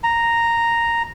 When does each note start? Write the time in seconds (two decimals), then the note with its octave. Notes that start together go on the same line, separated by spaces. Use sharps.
0.04 A#5